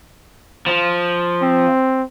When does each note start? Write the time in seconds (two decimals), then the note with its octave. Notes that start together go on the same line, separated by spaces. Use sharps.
0.67 F3
1.42 C4